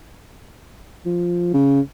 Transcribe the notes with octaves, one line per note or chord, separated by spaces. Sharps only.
F3
C#3